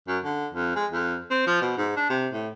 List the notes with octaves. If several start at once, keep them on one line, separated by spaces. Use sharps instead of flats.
F#2
D3
F2
G#3
F2
C4
F3
B2
G#2
D4
C3
A2